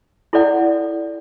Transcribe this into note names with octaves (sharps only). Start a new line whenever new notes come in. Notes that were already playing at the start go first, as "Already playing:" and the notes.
E4 A4 D5 F#5